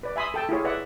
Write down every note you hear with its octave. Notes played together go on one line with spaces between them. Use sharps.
B4 D5
E5 G#5 B5 C6 D#6
A4 G5 A5
E4 F4 G#4 C#5
B4 D5 E5 F#5